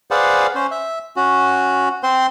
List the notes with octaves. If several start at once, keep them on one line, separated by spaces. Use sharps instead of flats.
G#4 B4 C5 D5 F5 F#5
C#4 C5
E5
C#4 F#4
C4 C5 C6